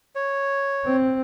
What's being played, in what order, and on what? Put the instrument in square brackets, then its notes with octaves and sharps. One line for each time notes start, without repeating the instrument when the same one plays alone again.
[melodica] C#5
[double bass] C4